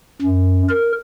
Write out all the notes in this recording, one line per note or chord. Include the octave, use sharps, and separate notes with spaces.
F#2
A#4